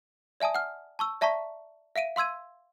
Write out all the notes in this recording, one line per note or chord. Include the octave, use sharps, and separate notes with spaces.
D5 E5 G#5 A5 D#6
F#5 F6
A5 C#6 E6
D5 E5 A5 A#5 C#6 B6
E5 F5 D7 D#7
F5 C6 E6 G#6 D#7